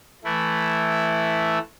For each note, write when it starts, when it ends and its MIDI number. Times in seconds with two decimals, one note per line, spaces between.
0.24 1.58 52
0.24 1.58 57
0.24 1.58 64